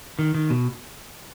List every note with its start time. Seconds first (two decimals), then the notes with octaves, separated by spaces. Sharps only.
0.19 D#3
0.35 D#3
0.50 B2